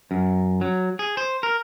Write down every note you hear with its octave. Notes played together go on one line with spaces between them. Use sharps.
F#2
F#3
G#4
C5
A#4